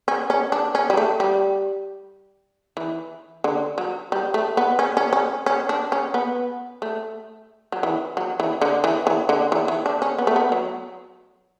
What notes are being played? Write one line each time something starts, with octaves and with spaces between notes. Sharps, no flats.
C#4
C#4
D4
C#4
G3
A3
G3
E3
D3
F#3
G3
A3
B3
C#4
C#4
C#4
C#4
D4
C#4
B3
A3
F#3
E3
F#3
E3
D3
E3
E3
D3
E3
E3
D4
C#4
B3
A3
B3
F#3